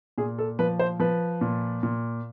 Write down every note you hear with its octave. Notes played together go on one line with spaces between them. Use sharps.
A#2 G#4
A4
F3 B4
C5
F3 B4
A#2
A#2